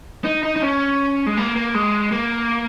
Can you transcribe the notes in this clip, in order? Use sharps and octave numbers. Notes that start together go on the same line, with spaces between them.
D#4
D#4
D#4
C#4
G#3
A#3
A#3
G#3
A#3